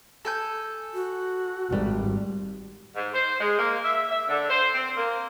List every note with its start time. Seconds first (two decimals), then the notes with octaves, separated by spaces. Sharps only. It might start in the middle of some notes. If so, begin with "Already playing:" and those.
0.25 A4 G#5 G6
0.94 F#4
1.72 G#1 G3
2.96 G#2
3.13 C5
3.40 G#3
3.59 A#3
3.85 E5
4.11 E5
4.29 D3
4.49 C5
4.75 C4
4.97 A#3